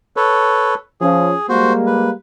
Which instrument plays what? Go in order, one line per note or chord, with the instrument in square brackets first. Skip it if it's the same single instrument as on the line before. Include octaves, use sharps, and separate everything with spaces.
[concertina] A4 B4 C#5
[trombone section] F3 C#4 [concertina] G#4
[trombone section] G3 G#3 A#3 [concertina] F#4 C5
[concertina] B4